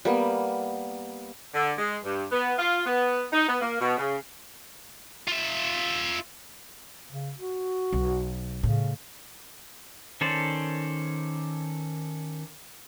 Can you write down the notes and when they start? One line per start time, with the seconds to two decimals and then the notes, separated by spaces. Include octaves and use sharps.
0.05 G3 A#3 B3
1.54 D3
1.78 G#3
2.04 G2
2.32 B3
2.59 F4
2.86 B3
3.33 D#4
3.48 B3
3.61 A#3
3.81 B2
3.98 C#3
5.28 F4 E5
7.10 C#3
7.38 F#4
7.93 B1
8.63 A2 C#3
10.21 D#3 C#4 A4 C5 D5